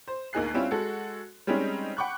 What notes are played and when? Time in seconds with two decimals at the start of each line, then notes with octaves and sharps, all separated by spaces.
0.08 C5
0.33 D2 A#3 D#4 G#4 F#6 C7
0.54 G3 C4 C#4 E4 F4
0.71 G#3 F#4 A4
1.47 G3 G#3 C4 C#4 D#4
1.97 F#5 G5 B5 C#6 D6 F#6